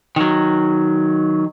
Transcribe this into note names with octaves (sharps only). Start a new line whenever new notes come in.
D#3 F#3